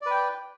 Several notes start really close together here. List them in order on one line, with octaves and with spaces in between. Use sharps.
D5 B4 G5